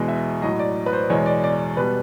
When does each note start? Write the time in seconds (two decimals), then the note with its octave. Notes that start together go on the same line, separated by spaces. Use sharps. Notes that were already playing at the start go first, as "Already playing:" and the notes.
Already playing: E2 B2 G#3 D#5
0.08 E5
0.42 A2 F#3 D#5
0.59 D5
0.86 B4
0.93 C5
1.10 E2 B2 G#3 C#5
1.26 D5
1.44 D5
1.77 B2 G3 B4